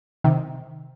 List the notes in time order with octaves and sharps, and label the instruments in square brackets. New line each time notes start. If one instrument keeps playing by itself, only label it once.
[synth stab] C3 D#3